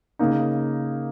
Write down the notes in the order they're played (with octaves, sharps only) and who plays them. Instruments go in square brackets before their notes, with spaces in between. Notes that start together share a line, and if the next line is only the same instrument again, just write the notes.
[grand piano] C#3 A#3 D#4